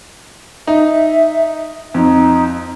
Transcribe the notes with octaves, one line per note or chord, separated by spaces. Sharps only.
D#4 E5
F2 D#4